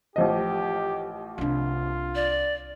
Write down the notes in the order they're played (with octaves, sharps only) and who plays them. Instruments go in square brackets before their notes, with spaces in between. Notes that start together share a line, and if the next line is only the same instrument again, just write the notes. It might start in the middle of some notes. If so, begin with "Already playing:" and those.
[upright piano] A1 F3 D#5 [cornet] G4
[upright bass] C2 D4 [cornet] F4
[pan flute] D5